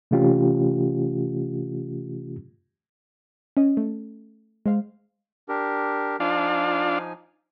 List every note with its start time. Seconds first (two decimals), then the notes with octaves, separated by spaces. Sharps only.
0.11 C3 E3 A3 C#4 F4 G4
3.57 C#4 D#5
3.77 A3
4.66 G#3 C5 F5
5.49 D4 G4 A#4
6.20 F3 D4 D#4 F4 G#5